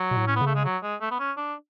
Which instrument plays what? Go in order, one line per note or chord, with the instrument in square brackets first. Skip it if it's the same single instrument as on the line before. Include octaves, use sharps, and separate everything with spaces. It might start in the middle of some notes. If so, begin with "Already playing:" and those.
Already playing: [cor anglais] F#3
[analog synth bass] B2
A2
[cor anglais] C#4
B3
[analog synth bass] C#3
[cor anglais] A3
G#3
F#3
G#3
A3
B3
C#4
D4